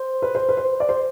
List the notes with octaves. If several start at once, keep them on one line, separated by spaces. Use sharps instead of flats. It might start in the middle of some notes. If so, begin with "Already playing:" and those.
Already playing: C5
B4
C5
B4
C5
D5
C5